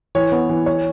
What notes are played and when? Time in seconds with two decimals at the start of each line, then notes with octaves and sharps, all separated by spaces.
0.15 E3 C#5
0.32 B3
0.50 E3
0.66 C#5